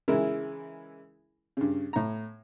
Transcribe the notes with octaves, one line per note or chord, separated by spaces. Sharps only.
C#3 E3 G#3 E4 A#4
G2 C#3
A2 A#5